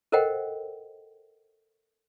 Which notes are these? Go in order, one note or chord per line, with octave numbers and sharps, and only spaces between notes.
A4 A#4 C5 D#5 F#5 G5